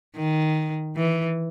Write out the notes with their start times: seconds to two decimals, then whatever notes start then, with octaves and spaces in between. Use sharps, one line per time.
0.16 D#3
0.96 E3